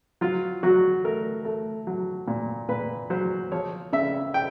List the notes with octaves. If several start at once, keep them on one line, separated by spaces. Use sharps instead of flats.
F#3 F4
F#3 F#4
A3 A#4
A3
F#3
A#2
A#2 B4
F#3 C5
F3 C#5
C#3 E5
G5